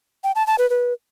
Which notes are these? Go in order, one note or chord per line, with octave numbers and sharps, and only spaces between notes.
G5
A5
A5
B4
B4